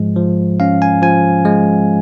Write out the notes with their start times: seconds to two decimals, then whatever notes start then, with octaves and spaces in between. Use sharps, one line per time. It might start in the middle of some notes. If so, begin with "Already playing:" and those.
Already playing: G#2 F3 G#3
0.16 F3
0.60 C#4 F5
0.82 G#5
1.02 F3 G#5
1.45 G#3